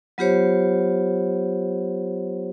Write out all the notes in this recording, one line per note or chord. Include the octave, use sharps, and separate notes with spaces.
F#3 B3 F4 G4 C5 C#5